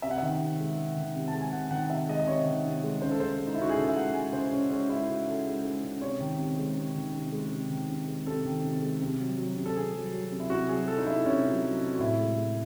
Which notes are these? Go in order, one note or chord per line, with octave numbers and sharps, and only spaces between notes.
C3 E5
F#5
D#3 E5
C3
G#3
C3
D#3
C3
A5
G#3
G#5
C3 F#5
D#3 F#5
C3 E5
G#3 D#5
D#5
C3 C#5
D#3
C3
G#3
C#3 C5
A4
G#3 C5
G#3
D#4
E4
C#3 F#4
G#4
C#3 A4
E5
G#3 F#5
G#3 G#5
C#3 C5
C#3 C#4
G#3 C#4
G#3 E4
C#3 F#4
C#3 A4
G#3
G#3
C#3
C3 C#5
D#3
C3
G#3
C3
D#3
C3
G#3
C3
D#3
C3
G#3
C3 A4
D#3
C3
G#3
C3
F#3
F#3
C3
A4
C3 G#4
F#3
F#3
C3
E4
C3 F#4
F#3 G#4
F#3 A4
D#4
C3 E4
C3 C#4
F#3
F#3
C3
F#4
A2 E4
G#3
G#3